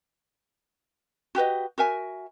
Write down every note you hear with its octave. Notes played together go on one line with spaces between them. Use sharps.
F#4 G4 B4 D#5
F#4 A#4 E5 G#5